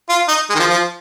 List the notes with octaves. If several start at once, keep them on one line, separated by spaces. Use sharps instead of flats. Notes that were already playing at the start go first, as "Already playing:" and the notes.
F4
D#4
G#3
D#3
F3
F3